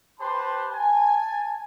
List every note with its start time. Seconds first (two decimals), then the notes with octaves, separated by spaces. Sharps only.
0.20 G4 B4 C5 A5 B5 C6
0.73 G#5 A5